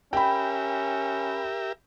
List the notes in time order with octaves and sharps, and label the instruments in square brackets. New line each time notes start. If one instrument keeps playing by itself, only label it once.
[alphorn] C#4 [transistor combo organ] G4 A#4 E5 [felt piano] G5 B5